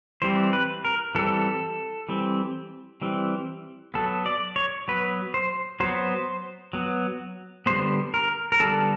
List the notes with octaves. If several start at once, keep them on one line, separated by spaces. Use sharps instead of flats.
E3 G3 C4 C5
B4
A#4
E3 G3 C4 A4
E3 G3 C4
E3 G3 C4
F#3 B3 A4
D5
C#5
F#3 B3 B4
C5
F#3 B3 C5
F#3 B3
D3 G3 B3 C5
A#4
A#4
D3 G3 B3 A4